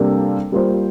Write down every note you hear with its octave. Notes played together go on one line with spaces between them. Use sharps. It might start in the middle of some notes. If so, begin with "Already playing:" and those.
Already playing: C3 G3 A#3 D4 A4
G3 A#3 F4 C5